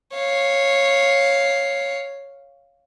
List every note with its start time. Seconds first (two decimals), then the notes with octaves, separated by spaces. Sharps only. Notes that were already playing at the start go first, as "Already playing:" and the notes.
0.14 C#5 F5